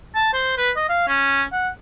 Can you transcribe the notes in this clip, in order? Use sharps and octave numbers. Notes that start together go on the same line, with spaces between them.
A5
C5
B4
D#5
F5
C#4
F#5